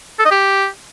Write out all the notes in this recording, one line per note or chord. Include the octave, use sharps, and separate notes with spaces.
A4
D#5
G4